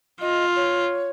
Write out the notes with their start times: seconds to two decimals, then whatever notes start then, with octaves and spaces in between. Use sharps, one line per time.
0.21 F4 D#5
0.56 C#5